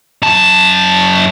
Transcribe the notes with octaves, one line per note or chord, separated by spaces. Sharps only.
F#2 A5